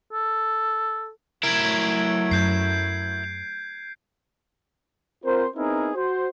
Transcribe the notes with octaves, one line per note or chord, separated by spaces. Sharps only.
A4
F#3 A3 E4 A#4 G#6 D7
F#2 G6 C7
C4 F4 A#4 C5
B3 C4 D#4 E4 G#4 A#4
F#4 C5